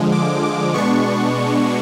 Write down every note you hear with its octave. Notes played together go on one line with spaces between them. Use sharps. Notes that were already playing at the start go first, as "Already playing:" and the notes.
Already playing: D3 F3 G#3
D6
D6
B2 G#3 B3 D4 C#6